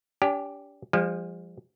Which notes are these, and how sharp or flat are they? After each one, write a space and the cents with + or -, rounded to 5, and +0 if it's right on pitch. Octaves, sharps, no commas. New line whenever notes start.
D4 -40 G4 +0 G#5 +0
F3 +0 G#3 -45